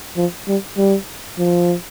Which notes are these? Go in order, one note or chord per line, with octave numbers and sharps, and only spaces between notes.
F3
G3
G3
F3